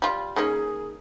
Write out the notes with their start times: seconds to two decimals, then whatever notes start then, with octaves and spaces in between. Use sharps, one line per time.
0.02 G3 F4
0.36 D#3 A#3 C#4 G#4